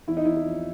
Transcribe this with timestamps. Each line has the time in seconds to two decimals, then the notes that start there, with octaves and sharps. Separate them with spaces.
0.07 E2 E4
0.17 D#4
0.25 E2 E4
0.36 E4
0.45 F3